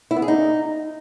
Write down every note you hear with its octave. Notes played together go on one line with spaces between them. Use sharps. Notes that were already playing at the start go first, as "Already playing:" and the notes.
E4
B3
G#4
D#4